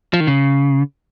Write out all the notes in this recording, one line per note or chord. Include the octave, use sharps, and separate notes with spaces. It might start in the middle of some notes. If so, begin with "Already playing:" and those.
F3
D#3
C#3